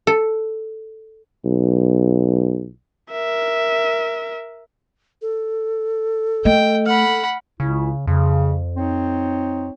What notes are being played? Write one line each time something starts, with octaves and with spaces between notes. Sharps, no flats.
A4
B1
A#4 E5
A4
A3 D#5 G5
F#5 B5 F6
C#2 C#3 E4
F2 C#3
C4 D#4 C#5